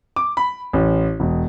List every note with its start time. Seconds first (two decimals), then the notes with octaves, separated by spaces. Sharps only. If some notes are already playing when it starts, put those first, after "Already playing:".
0.16 D6
0.37 B5
0.73 A1
1.20 E1